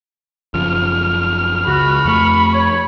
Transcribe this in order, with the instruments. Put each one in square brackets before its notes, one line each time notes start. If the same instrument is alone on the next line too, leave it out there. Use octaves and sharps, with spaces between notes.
[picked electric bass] F#1 C#3 F3 [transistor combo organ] F6
[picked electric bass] C#2 [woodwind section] F#4 [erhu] B5
[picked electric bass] F2 A3 [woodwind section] C#6
[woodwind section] C#5